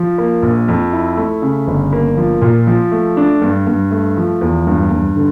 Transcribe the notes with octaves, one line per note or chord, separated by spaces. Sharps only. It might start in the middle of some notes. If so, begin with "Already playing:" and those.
Already playing: F3
A#3
A#1
F2
E4
A3
C#3
G1
A#3
F3
A#2
F3
A3
D4
G2
G2
A3
F3
E2
G2
G2
D3